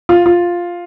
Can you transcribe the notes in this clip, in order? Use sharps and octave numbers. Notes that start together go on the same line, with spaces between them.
F4
F4